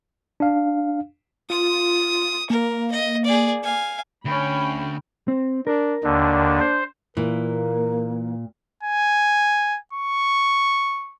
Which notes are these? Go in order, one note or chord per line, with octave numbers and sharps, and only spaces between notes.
D4 F5
F4 D#6
A#3 A#4
D#5
G#4 D5
F5 G#5
D2 C#4 G5 B5
C4
D4 A#4
D#2 D3 D4
C5
A#2 E3 A#3 A#4
G#5
C#6